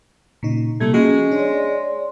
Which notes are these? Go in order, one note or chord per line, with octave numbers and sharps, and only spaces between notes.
A#2 C#3 D#4
C3 G3 A3 A#3 G#6
F3 G#3 C#4 F#4
D4 C#5 D5 C6